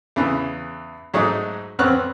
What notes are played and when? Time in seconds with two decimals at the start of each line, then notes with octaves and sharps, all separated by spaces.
0.16 E2 C#3 E3
1.14 G#2 F#3 G#3 A3 D#4
1.79 F2 B3 C4 C#5 F6 F#6